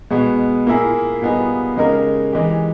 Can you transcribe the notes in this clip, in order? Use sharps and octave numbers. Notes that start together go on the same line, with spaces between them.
B2 G#3 B3
A#2 A#3 E4 G#4
A#2 G3 B3 D#4 G#4
C#3 G#3 D#4 G4 A#4
E3 G#3 D#4 G4